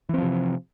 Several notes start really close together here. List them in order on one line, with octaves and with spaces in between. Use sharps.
E3 C4 F3 C3